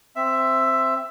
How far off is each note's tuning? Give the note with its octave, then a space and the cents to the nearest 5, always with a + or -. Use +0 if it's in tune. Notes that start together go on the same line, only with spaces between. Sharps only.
C4 +0 E5 +10